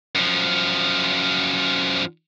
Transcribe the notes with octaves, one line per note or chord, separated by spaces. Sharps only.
F#2 F3